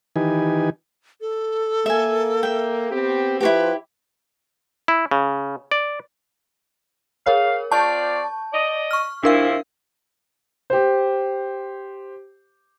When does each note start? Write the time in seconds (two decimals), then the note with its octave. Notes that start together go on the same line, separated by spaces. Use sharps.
0.16 D#3 E3 D#4 G4 B4 G#5
1.21 A4
1.86 A#3 E5 G#5
2.43 E5 G5
2.90 B3 C4 G4
3.41 F3 E4 F#4 G4 B4
4.88 E4
5.11 C#3
5.72 D5
7.27 G#4 A#4 C#5 F5
7.72 C4 F4 D5 A5 C#6 G6
8.54 D5 D#5
8.91 C#6 F6
9.23 C3 F3 D4 E4 A#4 F5
10.70 G4 C5